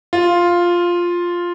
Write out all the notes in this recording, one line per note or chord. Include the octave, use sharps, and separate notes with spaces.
F4